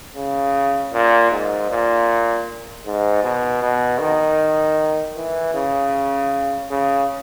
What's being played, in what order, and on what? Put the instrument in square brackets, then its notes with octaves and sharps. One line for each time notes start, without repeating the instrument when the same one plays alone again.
[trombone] C#3
A#2
G#2
A#2
G#2
B2
B2
D#3
E3
C#3
C#3